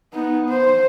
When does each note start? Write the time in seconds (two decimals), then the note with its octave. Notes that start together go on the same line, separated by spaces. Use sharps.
0.13 B3 D#4
0.49 C5